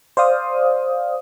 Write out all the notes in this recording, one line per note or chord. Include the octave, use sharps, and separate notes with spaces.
C5 D5 F5 D#6